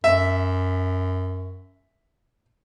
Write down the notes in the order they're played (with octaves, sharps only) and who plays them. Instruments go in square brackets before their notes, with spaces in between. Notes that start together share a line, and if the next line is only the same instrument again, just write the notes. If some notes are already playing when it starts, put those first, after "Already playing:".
[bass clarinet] F#2 [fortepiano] E5